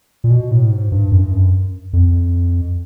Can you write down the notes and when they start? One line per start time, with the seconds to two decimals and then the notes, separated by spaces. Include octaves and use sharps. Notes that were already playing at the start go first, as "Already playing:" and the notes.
0.24 A#2
0.31 B2
0.51 A2
0.70 G#2
0.92 G2
1.12 F#2
1.21 G2
1.31 F#2
1.93 F2